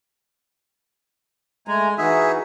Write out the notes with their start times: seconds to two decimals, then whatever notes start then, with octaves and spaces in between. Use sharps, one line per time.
1.68 G#3 A3 G#5 A#5
1.98 E3 D#4 F#4 G#4 E5